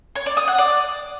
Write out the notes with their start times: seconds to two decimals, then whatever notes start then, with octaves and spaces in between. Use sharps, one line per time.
0.15 C#5
0.26 D5
0.37 D#6
0.48 F#5
0.58 D5